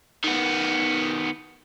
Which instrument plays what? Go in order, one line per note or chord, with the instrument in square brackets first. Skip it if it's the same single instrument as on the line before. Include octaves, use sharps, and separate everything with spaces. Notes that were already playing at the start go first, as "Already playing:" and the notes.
[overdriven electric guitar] D#3 B3